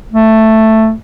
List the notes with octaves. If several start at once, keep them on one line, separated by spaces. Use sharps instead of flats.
A3